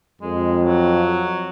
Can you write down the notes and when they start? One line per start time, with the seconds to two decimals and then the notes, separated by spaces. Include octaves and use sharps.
0.21 F2 G#3
0.62 F#3